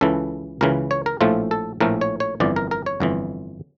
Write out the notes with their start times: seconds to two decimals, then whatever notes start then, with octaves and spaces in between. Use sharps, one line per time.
0.01 C#2 C#3 E3 A4
0.61 C#2 C#3 E3 A#4
0.91 C#5
1.06 A#4
1.21 A#1 A2 F3 A3 F4
1.51 A4
1.80 A#1 A2 F3 A3 A#4
2.01 C#5
2.20 C#5
2.40 G1 F2 E3 D5
2.56 A#4
2.71 A#4
2.86 C#5
3.00 G1 F2 E3